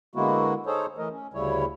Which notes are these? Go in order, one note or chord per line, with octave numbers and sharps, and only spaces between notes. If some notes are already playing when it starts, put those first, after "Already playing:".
D3 G#3 A#3 B3 E4 F#4
D#4 G#4 A4 C5 C#5
E3 A3 A#4 D#5
C#4
D2 C#3 G3 E4 C#5